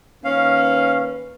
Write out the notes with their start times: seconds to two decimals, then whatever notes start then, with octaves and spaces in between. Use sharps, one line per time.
0.25 D#3 A#3 C#4 B4 F5